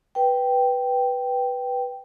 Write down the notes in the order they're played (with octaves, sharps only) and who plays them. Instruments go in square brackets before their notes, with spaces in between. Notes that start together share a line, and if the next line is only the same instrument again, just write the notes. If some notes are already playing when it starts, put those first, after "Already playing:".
[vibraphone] B4 G5